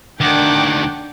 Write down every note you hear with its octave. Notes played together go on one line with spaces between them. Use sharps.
D2 D#3 D4 F#5 G5 D6